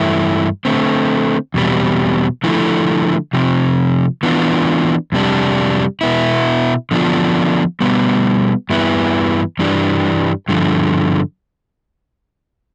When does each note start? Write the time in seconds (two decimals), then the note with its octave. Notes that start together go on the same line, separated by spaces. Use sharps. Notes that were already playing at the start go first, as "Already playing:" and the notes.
Already playing: G2 E3 A3 E4
0.65 D3 A3 C4
1.54 E2 B2 G3 C4
2.44 D3 F3 A3 E4
3.33 C3 F3 C4
4.23 E3 B3 D4 F4
5.12 F2 C3 G3 D4
6.01 B2 B3 E4
6.91 D3 F3 B3 D4 F4
7.81 B2 G3 B3
8.70 G2 E3 B3 E4
9.59 G2 E3 G3 D4
10.49 G2 D3 F3